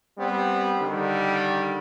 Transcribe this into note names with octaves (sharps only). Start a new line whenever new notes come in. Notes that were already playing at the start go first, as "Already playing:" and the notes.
G3 B3 C4
D3 D#3 G3